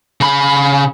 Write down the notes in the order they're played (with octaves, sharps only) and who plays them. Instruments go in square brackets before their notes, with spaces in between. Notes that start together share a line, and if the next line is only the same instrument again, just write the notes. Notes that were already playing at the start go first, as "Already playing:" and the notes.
[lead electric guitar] C#3 B5